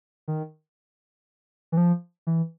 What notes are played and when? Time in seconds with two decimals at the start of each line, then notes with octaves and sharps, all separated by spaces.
0.28 D#3
1.72 E3
1.77 F3
2.27 E3